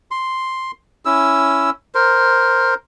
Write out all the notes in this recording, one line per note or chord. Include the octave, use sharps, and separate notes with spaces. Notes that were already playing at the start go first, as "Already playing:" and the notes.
C6
C#4 E4 E6
A#4 C5